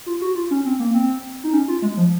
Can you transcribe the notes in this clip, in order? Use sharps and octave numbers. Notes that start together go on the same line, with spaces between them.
F4
F#4
F4
C#4
C4
A#3
C4
D#4
C#4
F4
G#3
F3